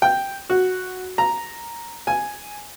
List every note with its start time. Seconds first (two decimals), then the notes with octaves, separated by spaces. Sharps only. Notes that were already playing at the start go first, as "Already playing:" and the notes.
0.02 G5
0.50 F#4
1.18 A#5
2.07 G#5